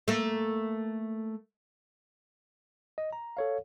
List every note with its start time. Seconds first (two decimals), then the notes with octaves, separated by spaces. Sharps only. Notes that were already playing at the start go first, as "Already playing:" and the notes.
0.08 A3 A#3
2.98 D#5
3.13 A#5
3.37 A4 C#5 F5